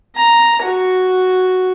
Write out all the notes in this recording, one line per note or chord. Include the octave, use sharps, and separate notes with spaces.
A#5
F#4